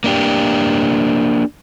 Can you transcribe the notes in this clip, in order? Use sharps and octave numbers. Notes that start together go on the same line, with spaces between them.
A#3 D4 G4